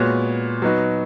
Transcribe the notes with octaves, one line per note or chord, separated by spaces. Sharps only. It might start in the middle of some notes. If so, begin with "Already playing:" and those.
Already playing: A#2 G#3 B3 F#4 C#5
F#3 B3 D#4 F#4 B4